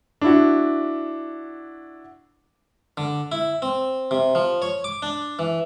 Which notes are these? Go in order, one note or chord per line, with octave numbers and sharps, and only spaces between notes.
D4 E4 F#4
D3
E4
C4
C3
F3
C#5
D6
D4
E3